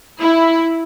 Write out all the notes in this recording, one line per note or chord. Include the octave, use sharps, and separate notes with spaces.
E4